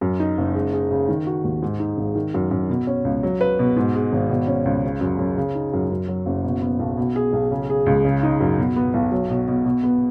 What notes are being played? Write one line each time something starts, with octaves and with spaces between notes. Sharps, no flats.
F#2
D#4
F#1
G#3
G#4
C#3
D#3
F#4
D#2
G#2
D#4
G#1
D#3
F#2
F#2
B2
C#4
C#2
F#3
B4
B2
G#2
G#3
G#1
B2
C#4
C#2
C#3
F#2
F#2
C#3
D#4
F#2
F#2
F#3
F#1
B2
B3
B1
B2
G#4
B1
C#3
G#4
C#2
C#3
D#4
F#2
B2
B3
B1
F#3
B2
B2
B2
B3